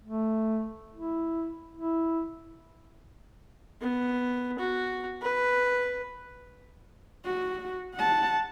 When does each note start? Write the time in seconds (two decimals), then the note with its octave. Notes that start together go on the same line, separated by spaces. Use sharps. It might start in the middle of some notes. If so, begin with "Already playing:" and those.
0.04 A3
0.94 E4
1.77 E4
3.81 B3
4.59 F#4
5.22 B4
7.25 F#4
7.94 F#5 A5